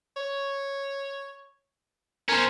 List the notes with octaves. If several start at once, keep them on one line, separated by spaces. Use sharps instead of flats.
C#5
C#4 A#4 C5